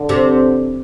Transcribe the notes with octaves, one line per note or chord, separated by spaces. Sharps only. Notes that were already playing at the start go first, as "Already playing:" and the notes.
Already playing: D3
C3